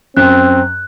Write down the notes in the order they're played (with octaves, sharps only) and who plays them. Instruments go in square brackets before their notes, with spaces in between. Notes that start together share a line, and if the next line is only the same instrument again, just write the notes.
[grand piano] F#2 [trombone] C4 [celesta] F#6